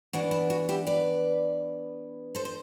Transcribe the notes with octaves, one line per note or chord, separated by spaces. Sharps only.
E3 B3 D4 F#4
E4
F#4
E4 G4
B4 D5
A4 C5
C5